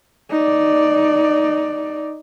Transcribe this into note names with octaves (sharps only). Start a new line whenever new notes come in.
D#4 D5